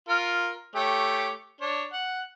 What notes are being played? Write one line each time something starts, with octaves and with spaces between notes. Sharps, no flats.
F4 A#4
A3 G4 C#5
D4 C#5
F#5